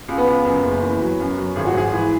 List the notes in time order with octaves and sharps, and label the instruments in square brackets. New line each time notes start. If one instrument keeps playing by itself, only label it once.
[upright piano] C#2
B3
C#2
F#2
F#1
E3
F#3
F#2
F#3
G#1 G#4
F#4
G#2 G#4
E3